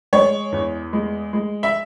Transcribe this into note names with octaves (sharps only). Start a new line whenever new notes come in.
G#3 C#5
E2
G#3
G#3
E5